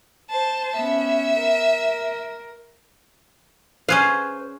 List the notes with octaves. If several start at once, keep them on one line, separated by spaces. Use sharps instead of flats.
C5 A5
B3 C#4 E5
A#4
C#4 G#4 B4 C5 F5